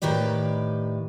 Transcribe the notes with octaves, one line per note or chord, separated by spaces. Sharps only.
A2 D#3 G4 B4 D5